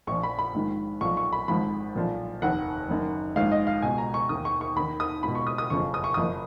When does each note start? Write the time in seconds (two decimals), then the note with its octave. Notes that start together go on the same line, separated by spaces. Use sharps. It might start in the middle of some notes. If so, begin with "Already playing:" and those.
0.07 A#1 A#2 F3 C#6
0.23 B5
0.39 B5
0.54 A#1 G#2 D#3
1.01 B1 A#2 F3 C#6
1.17 C#6
1.33 B5
1.48 G#1 G#2 F3 B5
1.95 B1 A#2 F3
2.42 F1 D#2 D#3 F#5
2.89 F#1 F#2 D#3
3.36 A#1 G#2 D#3 F5
3.52 D#5
3.67 F5
3.82 C#2 B2 G#5
3.98 A#5
4.14 C#6
4.29 D#2 D#3 D#6
4.45 C#6
4.61 C#6
4.76 D#2 D#3 B5
5.00 D#6
5.23 C#2 B2 B5
5.35 C#6
5.47 D#6
5.58 D#6
5.70 F#1 F2 C#3 F3 C#6
5.94 D#6
6.04 C#6
6.14 F#1 F#2 F3 D#6